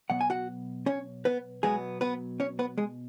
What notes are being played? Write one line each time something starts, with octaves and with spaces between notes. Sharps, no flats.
B2 F#3 B3 F#5
G#5
F#4 F#5
C#4 C#5
B3 B4
B2 F#3 G#3 B3 G#4
B3 B4
C#4 C#5
B3 B4
G#3 G#4